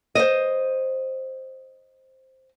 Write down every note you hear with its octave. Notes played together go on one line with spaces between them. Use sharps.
C5 D#5